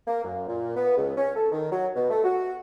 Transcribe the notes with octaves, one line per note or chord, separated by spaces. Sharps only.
A#3
F#2
A#2
B3
C#2
C#4
A4
D#3
F#3
B2
A3
F#4